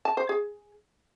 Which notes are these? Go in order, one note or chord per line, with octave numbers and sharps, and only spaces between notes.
A5
C5
G#4